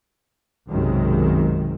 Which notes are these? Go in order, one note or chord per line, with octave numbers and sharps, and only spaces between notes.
B1 F#2 C3 D#3 G#3